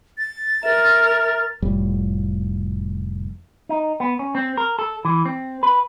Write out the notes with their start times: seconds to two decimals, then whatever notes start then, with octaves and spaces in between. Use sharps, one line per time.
0.18 A6
0.63 A#4 E5
1.62 F1 F2 A2 G3
3.69 D#4
4.00 B3
4.19 C#4
4.35 C4
4.57 A#4
4.79 A4
5.05 E3
5.25 C4
5.63 B4